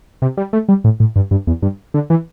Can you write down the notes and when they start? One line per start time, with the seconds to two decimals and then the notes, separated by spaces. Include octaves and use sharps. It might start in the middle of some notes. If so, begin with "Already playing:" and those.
0.22 C3
0.37 G3
0.53 A3
0.69 G3
0.84 A2
1.00 A2
1.16 G2
1.31 G2
1.47 E2
1.62 G2
1.94 D3
2.10 E3